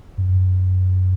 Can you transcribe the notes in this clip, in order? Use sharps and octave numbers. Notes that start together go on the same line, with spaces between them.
F#2